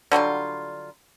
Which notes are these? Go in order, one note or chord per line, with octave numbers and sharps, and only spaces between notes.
D3 F#3 G3 F4